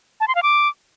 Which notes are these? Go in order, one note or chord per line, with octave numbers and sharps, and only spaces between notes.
A5
C6
F5
D6